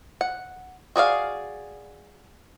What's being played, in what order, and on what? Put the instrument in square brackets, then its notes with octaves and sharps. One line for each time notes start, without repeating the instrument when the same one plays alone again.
[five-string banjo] F#5
F#4 G#4 D5 F5